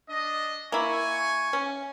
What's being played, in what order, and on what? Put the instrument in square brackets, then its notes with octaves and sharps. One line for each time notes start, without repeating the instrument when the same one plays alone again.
[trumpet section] D4 D#5
[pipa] A#3 E4 [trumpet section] G#5 C#6
[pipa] C#4